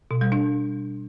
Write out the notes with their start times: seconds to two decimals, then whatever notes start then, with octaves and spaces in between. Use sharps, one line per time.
0.11 B2
0.21 G3
0.32 D4